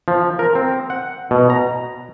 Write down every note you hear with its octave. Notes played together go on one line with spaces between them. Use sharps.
F3
A#4
C4
F#5
B2
A#5